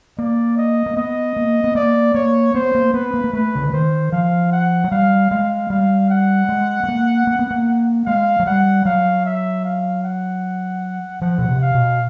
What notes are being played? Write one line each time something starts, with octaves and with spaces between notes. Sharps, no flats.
A#3 D5
D#5
A#3
B3 D#5
A#3
B3
A#3 D5
A#3 C#5
B3 C5
A#3
B3 B4
A#3
A#3
A3 B4
C#3
D3
D#3 C5
F3 F5
F#5
F#3
G3 F5
G#3 F5
G3 F5
F#5
G#3
A3
A#3
A#3
B3
A#3
G#3 F5
F#3
G3 F#5
F#3 F5
E5
F5
F#5
F3 F#5
B2
C3
F5
B2